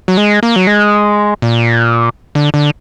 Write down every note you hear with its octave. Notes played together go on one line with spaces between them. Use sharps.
F#3
G#3
A#3
F#3
G#3
A#2
D3
D3